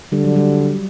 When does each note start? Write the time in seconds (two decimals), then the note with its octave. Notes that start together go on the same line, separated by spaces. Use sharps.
0.12 D3 G3
0.24 F#3
0.36 G3